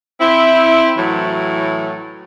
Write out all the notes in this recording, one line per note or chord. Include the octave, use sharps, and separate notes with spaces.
C4 E4
A2 E3 F#3